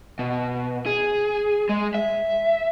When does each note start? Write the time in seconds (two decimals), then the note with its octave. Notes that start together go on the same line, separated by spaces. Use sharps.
0.19 B2
0.86 G#4
1.69 G#3
1.94 E5